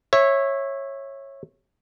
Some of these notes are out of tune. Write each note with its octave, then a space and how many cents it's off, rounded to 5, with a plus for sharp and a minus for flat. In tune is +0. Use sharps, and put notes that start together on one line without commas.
C#5 -20 E5 +0